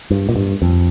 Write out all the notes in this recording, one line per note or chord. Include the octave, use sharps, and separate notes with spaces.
G2
A#2
G2
F2